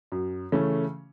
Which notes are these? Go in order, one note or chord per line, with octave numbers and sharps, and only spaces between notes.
F#2
C#3 E3 A3 C#4